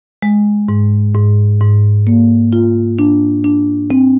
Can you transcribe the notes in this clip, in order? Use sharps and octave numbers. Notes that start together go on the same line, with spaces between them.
G#3
G#2
G#2
G#2
A#3
F4
D4
D4
C4